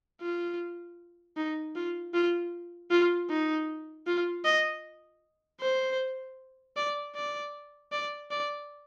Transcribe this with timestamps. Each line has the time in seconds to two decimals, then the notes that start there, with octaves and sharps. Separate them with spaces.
0.21 F4
1.37 D#4
1.76 F4
2.14 F4
2.91 F4
3.30 D#4
4.07 F4
4.45 D#5
5.60 C5
6.77 D5
7.16 D5
7.92 D5
8.31 D5